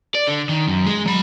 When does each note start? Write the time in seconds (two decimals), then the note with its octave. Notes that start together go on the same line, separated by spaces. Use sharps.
0.15 D5
0.28 D3
0.49 D#3
0.68 F#2
0.87 G#3
1.06 F#3 B5